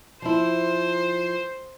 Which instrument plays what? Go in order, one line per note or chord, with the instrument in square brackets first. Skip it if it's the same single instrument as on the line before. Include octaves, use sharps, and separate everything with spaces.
[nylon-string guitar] F3 E4 [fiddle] C5